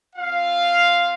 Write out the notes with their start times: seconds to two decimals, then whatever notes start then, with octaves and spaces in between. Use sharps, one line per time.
0.16 C4 F4 F5